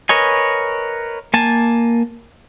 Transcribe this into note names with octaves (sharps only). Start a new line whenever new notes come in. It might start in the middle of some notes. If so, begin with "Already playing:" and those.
A#4 B4 C#5 D#5 G#5
A#3 G#5 A5